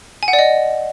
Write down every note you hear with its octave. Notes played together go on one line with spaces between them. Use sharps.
G#5
F#5
D5
D#5